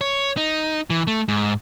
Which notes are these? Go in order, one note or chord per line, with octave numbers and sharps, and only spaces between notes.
C#5
D#4
E3
A3
G#2